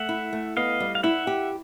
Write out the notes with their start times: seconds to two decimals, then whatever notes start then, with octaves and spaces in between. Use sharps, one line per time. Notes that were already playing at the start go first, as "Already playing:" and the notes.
Already playing: A3 E5 F#5
0.09 E4
0.33 A3
0.57 B3 D#5 F5
0.80 G3
0.95 F5
1.03 E4 E5 F#5
1.27 G4